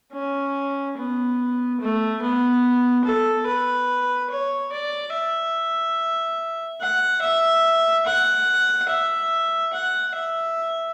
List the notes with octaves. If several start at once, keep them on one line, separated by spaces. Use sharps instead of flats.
C#4
B3
A3
B3
A4
B4
C#5
D5
E5
F#5
E5
F#5
E5
F#5
E5